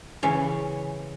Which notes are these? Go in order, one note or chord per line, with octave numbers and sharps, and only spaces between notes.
C#3 E3 C#5